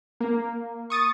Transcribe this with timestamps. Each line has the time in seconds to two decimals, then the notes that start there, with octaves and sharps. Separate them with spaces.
0.21 A#3
0.90 C#6 D#6 A6